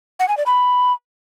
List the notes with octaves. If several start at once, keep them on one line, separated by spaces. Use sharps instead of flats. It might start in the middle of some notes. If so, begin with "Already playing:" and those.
F#5
G#5
D5
B5